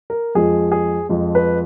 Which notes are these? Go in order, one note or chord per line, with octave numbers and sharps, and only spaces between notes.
A#4
F2 F3 G#3 G#4
G#4
F2 F3 G#3
B4